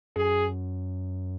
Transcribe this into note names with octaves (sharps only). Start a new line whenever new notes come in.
F#2 G#4